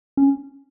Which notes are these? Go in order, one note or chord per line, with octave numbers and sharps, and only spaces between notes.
C#4